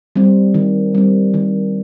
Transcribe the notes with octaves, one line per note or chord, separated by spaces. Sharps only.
G3 C4
D#3
G3 C4
D#3